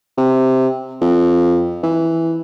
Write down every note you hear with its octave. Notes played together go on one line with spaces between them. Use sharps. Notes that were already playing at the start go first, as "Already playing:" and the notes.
C3
F2
E3